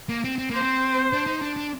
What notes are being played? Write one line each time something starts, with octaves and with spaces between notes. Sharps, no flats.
A#3
C4
C4
A#3 C5
C4
D4
D#4
D4
D4